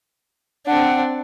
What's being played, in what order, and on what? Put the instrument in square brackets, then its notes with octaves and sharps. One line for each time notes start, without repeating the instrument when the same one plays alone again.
[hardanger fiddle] C4 D4 [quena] F#5